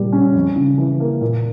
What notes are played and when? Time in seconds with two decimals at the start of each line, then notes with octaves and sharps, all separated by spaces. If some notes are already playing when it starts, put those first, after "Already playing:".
Already playing: A#2 G3
0.13 C#4
0.35 F2
0.56 C#3
0.78 E3
1.00 A#3
1.21 A#2